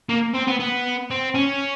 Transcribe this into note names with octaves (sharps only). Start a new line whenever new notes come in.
A#3
C4
B3
B3
C4
C#4